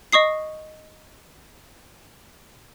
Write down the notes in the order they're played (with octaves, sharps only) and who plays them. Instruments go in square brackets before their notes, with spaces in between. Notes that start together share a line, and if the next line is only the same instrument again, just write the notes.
[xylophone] D#5 C#6 D#6 C7